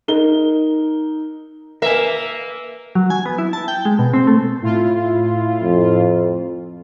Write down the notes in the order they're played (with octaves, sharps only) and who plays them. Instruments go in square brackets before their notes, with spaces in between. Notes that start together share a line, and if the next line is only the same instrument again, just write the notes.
[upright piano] D#4 A#4 G7
[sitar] A#3 E5 [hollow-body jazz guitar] A#4 B4 G#5
[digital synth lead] F#3
G#5
B3
E4
A5
G5
G#3
B2
C4
A3
[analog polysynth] A2 E4 F4
[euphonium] F2